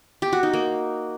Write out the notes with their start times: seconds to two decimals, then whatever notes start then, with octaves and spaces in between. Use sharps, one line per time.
0.22 G4
0.33 F#4
0.43 D#4
0.53 A#3